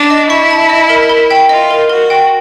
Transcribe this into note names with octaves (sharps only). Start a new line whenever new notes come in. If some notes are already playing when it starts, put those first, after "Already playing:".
Already playing: D4
D#5
E4 C#6
A5
D#5
A#4
A#4
G5
F4 D#5
A#4
F#4 A#4
G5